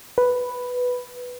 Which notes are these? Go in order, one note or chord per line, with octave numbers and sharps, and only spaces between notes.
B4